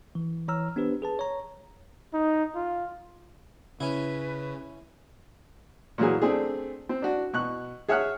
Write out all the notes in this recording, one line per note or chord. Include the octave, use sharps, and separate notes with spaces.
E3
E3 C#5 A#5 E6 F6
B3 D4 G4 B4 C5
G#4 B4 A5
C#5 A#5
D#4
F4
C#3 C#4 E4 B4
A#2 E3 F#3 G#4
A3 C4 D4 G#4
C4
D4 F#4
B2 C#6 F#6
G#4 C#5 E5 F#5 F6 F#6